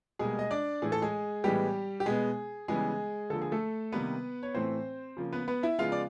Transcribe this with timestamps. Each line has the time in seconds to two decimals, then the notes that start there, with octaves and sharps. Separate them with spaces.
0.19 B2 G3 G#3 A#3 G#4
0.39 D#5
0.51 D4 D5
0.82 A2 E3 A3 G#4
0.92 A4
1.02 G#3 G#4
1.44 A2 E3 G3 G#3 B3 G4
2.00 G4
2.06 B2 G#3 B3 G#4
2.68 C#3 E3 G3 G#3 B3 G#4
3.30 D3 F3 A#3 A4
3.42 G#4
3.52 A3 A4
3.92 C3 D#3 G3 A#3 B3 B4
4.43 C#5
4.55 A2 E3 A3 C4 C5
5.17 C#3 F3 A#3
5.33 B3 B4
5.48 B3 B4
5.63 E4 E5
5.79 C#3 F3 G#3 B3 F4 F5
5.92 D5